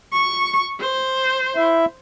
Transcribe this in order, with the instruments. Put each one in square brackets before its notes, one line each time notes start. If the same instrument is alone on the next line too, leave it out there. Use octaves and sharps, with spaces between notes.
[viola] C#6
C5
[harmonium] E4 E5